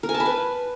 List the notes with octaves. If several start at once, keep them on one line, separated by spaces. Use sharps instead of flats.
A#4
G#5
A5
B5
B4